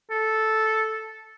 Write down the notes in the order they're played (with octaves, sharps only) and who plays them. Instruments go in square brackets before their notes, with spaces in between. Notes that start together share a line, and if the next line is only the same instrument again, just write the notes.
[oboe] A4